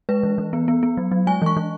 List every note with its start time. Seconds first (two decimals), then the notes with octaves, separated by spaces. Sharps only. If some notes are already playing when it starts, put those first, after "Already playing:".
0.09 G#3 B4
0.23 E3
0.38 E3
0.53 B3
0.68 B3
0.83 B3
0.97 F#3
1.12 F#3
1.27 G#3 G#5
1.42 E3 C#6
1.57 E3